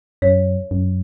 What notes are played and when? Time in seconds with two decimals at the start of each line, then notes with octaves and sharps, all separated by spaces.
0.22 F#2 C#5
0.71 F#2